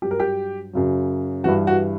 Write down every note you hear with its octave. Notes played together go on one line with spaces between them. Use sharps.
G2 F#3 G4
A#4
G4
F#2 C#3 F#3
G2 E3 G3 F#4
F#4